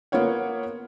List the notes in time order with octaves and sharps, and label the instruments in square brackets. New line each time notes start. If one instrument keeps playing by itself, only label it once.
[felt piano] A#3 B3 F4 C#5 F#5